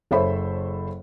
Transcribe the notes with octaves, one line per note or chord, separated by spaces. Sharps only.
F#1 A4 C5 C#5 E5 B5